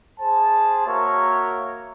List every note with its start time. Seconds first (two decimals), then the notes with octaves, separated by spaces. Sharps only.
0.20 G#4 C5 A5
0.86 A#3 F#4 A#4 C#5 E5